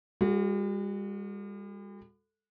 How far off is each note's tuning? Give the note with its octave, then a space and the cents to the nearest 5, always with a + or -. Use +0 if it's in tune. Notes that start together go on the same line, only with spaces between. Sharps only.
G3 +45 F#4 -20 A4 +0